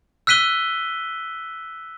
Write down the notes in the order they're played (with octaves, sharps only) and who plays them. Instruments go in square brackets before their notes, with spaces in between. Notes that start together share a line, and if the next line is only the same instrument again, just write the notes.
[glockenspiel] E6 F#6 B6 D#7 G7